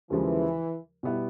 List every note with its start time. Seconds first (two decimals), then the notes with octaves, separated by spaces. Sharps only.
0.10 D#2 C#3 E3 F3 G#3
1.03 B2 G3 B3 E4